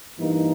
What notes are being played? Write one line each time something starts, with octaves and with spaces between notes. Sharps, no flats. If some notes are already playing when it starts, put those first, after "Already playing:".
G2 E3 A#3 D#4